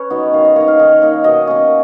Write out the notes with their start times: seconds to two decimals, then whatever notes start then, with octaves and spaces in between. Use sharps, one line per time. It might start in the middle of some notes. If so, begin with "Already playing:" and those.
Already playing: C#4 B4 C#5
0.10 F#3 B3 D#4
0.33 D#3 F5
0.45 D#5
0.56 A#3 D#4 C#5
0.68 F5
0.79 D#3 D#5
1.02 A#3 D#4
1.24 B2 D#5
1.47 A#3 C#4